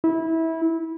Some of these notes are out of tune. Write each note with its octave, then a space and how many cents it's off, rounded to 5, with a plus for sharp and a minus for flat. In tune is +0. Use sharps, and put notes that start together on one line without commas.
E4 -20